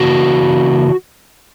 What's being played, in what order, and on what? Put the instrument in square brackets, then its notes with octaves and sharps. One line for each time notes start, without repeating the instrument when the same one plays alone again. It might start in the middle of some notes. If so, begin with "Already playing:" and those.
Already playing: [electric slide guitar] C#3 E3 A#3 D4 F#4